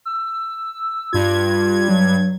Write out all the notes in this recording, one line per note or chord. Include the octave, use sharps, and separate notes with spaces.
E6
G2 F4 G#6
F#3